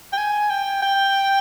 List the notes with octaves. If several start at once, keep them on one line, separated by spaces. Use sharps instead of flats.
G5
G#5
G5
G5